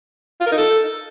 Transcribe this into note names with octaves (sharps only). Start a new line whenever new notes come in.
F4
A#4
D#4
A4